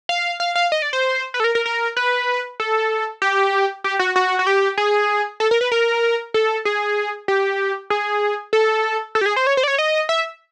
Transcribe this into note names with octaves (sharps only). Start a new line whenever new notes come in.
F5
F5
F5
D#5
D5
C5
B4
A4
A#4
A#4
A#4
B4
A4
G4
G4
F#4
F#4
F#4
G4
G#4
A4
A#4
B4
A#4
A4
G#4
G4
G#4
A4
A4
G4
G#4
C5
C#5
C5
D5
C#5
D#5
E5